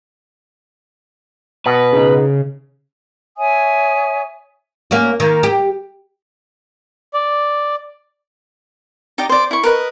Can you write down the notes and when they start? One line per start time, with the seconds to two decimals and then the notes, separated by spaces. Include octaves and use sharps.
1.66 B2 B4
1.93 C#3 D#4 G#4
3.37 C#5 E5 G#5 D#6
4.91 A#3 C#4 F#4
5.20 D#3 A#3
5.43 G4
7.14 D5
9.18 D#4 G4 D5 A#5
9.29 C5 D5
9.51 E4 C#6
9.63 A#4 B4 D#5